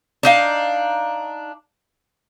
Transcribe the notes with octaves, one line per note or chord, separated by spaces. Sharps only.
D4 D#4 F5